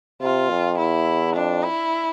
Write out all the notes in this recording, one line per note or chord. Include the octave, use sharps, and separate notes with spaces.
C3 F4
F2
E2 E4
F2 D4
E4